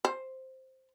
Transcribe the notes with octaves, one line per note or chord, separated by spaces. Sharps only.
C5